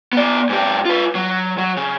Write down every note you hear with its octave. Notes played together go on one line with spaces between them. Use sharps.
B3 D5
G#2 G4
F4 B4
F#3
F#3
C#3